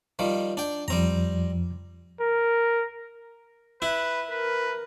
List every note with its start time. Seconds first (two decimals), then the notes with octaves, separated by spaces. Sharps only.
0.19 D#3 F3 G3
0.57 D4 G5
0.88 F2 F3 G3 C4 A#5
2.20 A#4
3.82 E4 B4
4.30 A#4 B4